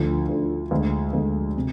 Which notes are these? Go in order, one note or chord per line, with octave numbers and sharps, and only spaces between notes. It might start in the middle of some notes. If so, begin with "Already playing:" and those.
Already playing: D2 D3 F3
D2 D3 F3
D2 D3 G#3
D2 D3 G#3
C3